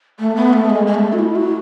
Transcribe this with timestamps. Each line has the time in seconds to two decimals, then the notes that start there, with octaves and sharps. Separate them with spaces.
0.19 A3
0.36 B3
0.53 A3
0.70 G#3
0.87 G#3
0.94 A3
1.13 F#4
1.19 E4
1.36 F#4